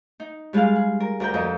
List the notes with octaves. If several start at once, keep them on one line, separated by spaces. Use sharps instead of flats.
D#4
G3 G#3 F4 G#4 F5
G#4
A#4
D2 A#4 G5
F2 C4 A#4 D#5